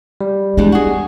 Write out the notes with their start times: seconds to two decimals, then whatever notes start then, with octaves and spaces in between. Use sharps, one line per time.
0.21 G3
0.57 E2 E3 G#3 D4
0.72 F#4 G#4